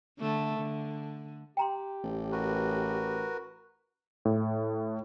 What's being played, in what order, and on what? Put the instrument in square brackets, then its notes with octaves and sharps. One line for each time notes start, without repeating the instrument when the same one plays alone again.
[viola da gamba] D3 A3
D3
[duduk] G4 [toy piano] G5 A#5 C6
[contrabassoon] A1
[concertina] F#4 A#4 B4
[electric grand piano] A2